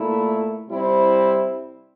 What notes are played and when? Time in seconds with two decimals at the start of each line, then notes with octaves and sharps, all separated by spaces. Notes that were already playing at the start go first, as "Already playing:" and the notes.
Already playing: A#2 A3 E4
0.69 C3 G3 C4 E4